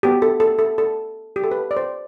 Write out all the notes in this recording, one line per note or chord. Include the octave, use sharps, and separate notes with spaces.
B3 F#4 G4
A4
A4
A4
A4
G4
A4
B4
D5
C5